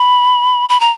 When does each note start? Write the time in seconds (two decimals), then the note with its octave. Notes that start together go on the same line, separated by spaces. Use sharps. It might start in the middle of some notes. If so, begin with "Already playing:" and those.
Already playing: B5
0.69 B5
0.80 A#5